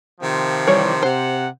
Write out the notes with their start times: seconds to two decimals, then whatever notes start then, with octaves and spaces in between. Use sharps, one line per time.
0.21 C3 D#3 F3
0.67 E3 G3 C#5
1.03 C3 C5 F#5